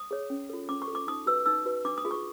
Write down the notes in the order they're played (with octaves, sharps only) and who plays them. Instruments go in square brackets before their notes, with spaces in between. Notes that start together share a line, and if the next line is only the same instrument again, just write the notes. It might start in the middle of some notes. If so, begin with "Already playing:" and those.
Already playing: [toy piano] D#6
G#4 C#5
C#4
F4 A4
C#4 D6
C#6
A4
F4 D6
D#4 D#6
F#4 B4 E6
D#4 E6
F#4 B4
D4 D6
D#6
F4 G#4
C#6